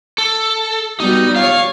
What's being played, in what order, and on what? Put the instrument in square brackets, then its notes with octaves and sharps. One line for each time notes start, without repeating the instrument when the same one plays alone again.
[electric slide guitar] A4
[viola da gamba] G3 B3 F#4 [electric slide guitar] D#4
[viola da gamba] F4 C#5 [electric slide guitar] F5